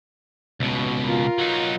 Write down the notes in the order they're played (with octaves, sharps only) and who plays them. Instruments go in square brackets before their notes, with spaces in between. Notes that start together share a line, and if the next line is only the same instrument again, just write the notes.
[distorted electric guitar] C#2 B2
[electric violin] F4 A#4
[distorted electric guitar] F#3 D#4